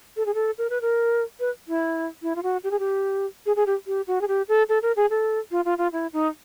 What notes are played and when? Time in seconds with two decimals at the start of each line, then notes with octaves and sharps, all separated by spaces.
0.17 A4
0.26 G#4
0.34 A4
0.58 A#4
0.70 B4
0.81 A#4
1.40 B4
1.68 E4
2.23 E4
2.36 F4
2.43 F#4
2.64 G4
2.71 G#4
2.79 G4
3.46 G#4
3.56 G#4
3.66 G4
3.87 G4
4.07 F#4
4.21 G#4
4.28 G4
4.49 A4
4.69 A4
4.82 A#4
4.96 G#4
5.10 A4
5.51 F4
5.65 F4
5.78 F4
5.93 E4
6.13 D#4